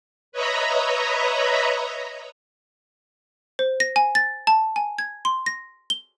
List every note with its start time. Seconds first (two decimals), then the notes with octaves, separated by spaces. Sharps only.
0.32 B4 C#5 D#5 E5 A#5 B5
3.59 C5
3.80 A#6
3.96 G#5
4.15 A6
4.47 A5
4.76 G#5
4.99 G#6
5.25 C6
5.46 A#6
5.90 G7